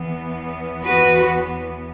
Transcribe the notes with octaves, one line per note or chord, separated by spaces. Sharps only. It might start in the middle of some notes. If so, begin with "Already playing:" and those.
Already playing: E2 E3 B3
F#4 B4